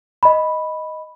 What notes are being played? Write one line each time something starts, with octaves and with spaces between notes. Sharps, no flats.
D#5 B5